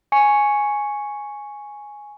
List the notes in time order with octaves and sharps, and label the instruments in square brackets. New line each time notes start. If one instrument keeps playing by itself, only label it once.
[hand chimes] G#5 C#6 C#7